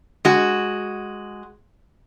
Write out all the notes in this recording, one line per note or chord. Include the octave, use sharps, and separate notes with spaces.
G#3 F#4